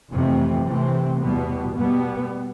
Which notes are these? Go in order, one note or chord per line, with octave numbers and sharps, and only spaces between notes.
F2 C3 E3 A3
C3 E3 A3 C4
E2 B2 G3 B3
B2 G3 B3